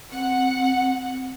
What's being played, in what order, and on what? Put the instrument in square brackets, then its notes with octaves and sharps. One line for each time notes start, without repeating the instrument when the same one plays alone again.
[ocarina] C4 [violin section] F#5